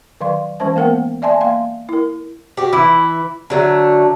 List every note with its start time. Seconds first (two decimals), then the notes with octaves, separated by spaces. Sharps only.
0.21 D#3 F#3 F5 C6
0.60 E3 G#3 C#4 C5 A5
0.76 A#3 B3 A#4 F#5 G5
1.22 D5 E5 G#5 A5 C6
1.41 A#3 F5 G5 C6
1.89 E4 A#4
2.57 F#4 G4
2.73 E3 E4
3.50 D3 F#3 A3